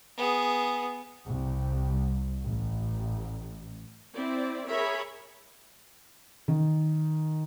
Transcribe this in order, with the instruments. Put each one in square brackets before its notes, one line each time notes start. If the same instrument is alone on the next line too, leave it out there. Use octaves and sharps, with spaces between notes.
[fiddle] B3 G#4
[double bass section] C2
A1
[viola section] C4 E4 D5
G#4 A#4 C#5 E5 B5
[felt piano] D#3